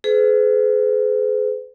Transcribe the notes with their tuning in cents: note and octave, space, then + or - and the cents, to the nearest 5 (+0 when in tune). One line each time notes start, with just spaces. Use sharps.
G#4 +35 B4 +45